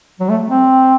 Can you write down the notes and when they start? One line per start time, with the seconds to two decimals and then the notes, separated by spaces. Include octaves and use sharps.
0.20 F#3
0.29 A3
0.48 C4